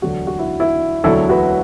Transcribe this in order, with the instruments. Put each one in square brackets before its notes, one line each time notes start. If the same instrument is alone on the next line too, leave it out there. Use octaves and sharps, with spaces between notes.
[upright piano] E1 D2 D3 F#3 F#4
F#4
E4
E4
E1 D2 D3 F#3 E4 A4
F#4 B4